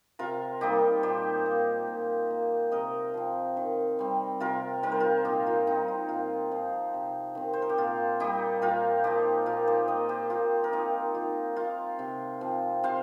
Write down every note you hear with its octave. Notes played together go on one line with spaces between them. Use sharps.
C3 F4 A#4
D#3 G3 A#3 D#4 G4
A#2 G4 C5
A#3
A#2
A#3
C3 A#4 D#5
F3 C4
D#3
G3 C4
C3 F4 A#4
D#3 G3 C4 A#4
C5
F4 A#4
A#2 D#4 G4
F4
G3 C4 D#4
F4
A#2 F4
F3 C4
C3
D#3 C4
C5
A#4
G4
A#2 F4
G3 A#3 D#4 G4
A#2 F4 A#4
F3 A#3 D#4 G4
A#2 F4 A#4
G4 C5
A#3 A#4 D#5
G4 C5
A#2 F4 A#4
A#4
F3 C4 D#4 G4
D#3 F4
A#3 F4
C3
F3 C4
C3 C5 F5